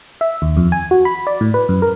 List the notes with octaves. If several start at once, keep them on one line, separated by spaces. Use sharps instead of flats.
E5
D#2
F2
G#5
F#4
B5
D5
A2
B4
F#2
A#4